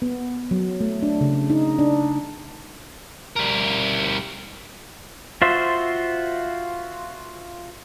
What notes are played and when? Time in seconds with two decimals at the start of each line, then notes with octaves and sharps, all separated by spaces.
0.02 B3
0.51 F#3
0.81 A3
1.02 D4
1.21 C#3
1.50 D#4
1.79 D4
3.36 G3 A#4
5.42 F4 F#4 C5 E5